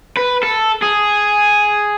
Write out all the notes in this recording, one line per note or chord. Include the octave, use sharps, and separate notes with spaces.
B4
A4
G#4